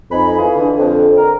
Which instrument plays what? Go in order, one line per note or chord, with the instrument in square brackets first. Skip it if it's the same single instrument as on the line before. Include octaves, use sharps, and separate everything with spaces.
[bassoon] F2 [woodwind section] D#4 G#5 B5
[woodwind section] E3 F4 G#4
[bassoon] D3
[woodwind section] F2
A#4